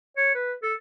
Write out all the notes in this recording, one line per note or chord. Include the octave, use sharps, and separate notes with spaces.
C#5
B4
A4